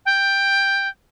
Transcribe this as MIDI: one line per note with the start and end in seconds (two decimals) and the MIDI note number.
0.06 0.88 79